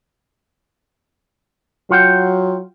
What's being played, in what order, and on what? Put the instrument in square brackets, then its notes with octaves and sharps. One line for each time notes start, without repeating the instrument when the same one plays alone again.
[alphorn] F#3 [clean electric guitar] F4 F#5 G5